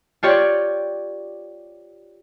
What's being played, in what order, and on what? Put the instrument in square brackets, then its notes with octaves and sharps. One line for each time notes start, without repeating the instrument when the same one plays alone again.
[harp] F4 G4 C#5 D5